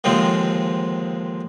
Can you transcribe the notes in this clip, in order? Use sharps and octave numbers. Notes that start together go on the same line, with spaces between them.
D#2 D3 F3 G#3 C4